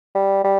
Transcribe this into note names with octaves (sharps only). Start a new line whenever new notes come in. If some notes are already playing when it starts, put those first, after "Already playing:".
G3
G3